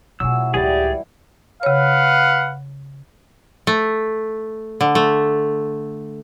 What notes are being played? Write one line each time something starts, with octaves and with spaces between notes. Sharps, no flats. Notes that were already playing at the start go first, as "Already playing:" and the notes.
B2 F#3 A3 E4 G#4 E6
C#2 A2 E3 G3 G4 G#4 D5
C#3 B4 C#5 F5 F#5
A3
D3
A3